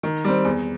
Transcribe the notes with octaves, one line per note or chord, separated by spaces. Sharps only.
D#3
G3 C4
E2